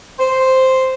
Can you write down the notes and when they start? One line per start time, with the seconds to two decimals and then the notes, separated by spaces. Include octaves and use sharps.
0.19 C5